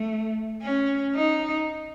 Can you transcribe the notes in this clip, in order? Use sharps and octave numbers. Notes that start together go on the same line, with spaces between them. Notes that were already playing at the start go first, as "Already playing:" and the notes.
Already playing: A3
C#4
D#4